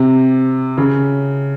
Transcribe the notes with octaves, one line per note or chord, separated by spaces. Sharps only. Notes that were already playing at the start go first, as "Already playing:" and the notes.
Already playing: C3
C#3